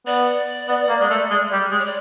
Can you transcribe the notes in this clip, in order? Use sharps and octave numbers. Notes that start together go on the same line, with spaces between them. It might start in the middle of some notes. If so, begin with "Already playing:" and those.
B3 D5
B3
A#3
G#3
A3
G#3
G3
G#3
C#5
D5